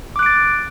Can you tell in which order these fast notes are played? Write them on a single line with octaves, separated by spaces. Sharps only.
D6 F#6 D7 A6